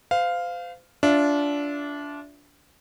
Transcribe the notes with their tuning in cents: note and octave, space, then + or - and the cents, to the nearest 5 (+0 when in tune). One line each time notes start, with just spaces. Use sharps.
C5 -40 F5 +0
D4 -20 F4 +5 E5 +0